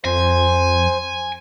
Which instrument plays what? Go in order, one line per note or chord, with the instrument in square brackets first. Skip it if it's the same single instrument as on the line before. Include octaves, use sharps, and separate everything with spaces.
[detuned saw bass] F2 [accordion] C5 [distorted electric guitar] G#5